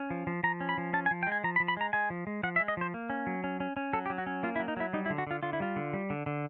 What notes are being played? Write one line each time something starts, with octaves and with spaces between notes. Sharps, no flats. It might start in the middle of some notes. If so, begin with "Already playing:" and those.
Already playing: C#4
F3
F3
F3 A#5
C#4
B5
F3
C#4 A5
G#5
F3
G5
G#3
G#5
F3 A#5
B5
F3
B5
G#3 A#5
G#3 G#5
F3
G#3
F3 F#5
E5
G#3
D#5
F3 C5
A#3
C#4
F#3
C#4
C#4
C#4
F#3 A4
G4
F#3
F#4
C#4
A#3 F4
E4
F#3
D#4
F#3 E4
G3 D#4
E4
D3
F#4
D3 F4
D3 F4
E4
G3 F4
D3
G3
D3
D3